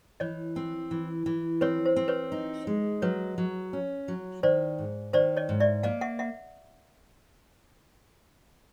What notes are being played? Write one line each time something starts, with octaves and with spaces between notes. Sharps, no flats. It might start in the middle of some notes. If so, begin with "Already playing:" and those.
E3 C#5 D#5
C4
E3
E3
C4 B4 C#5
C5
C4
B4 C#5
D#4
G#3
F#3 B4 C#5
F#3
C#4
F#3
D#3 C5 D5
G#2
D#3 C5 D5
C#5 D#5
G#2
D5 E5
A#3 D#5 F5
E5 F#5
E5 F#5